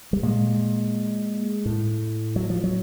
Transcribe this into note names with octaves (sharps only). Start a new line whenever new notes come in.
G3
A#2 G#3
A2
F#3
F3
F#3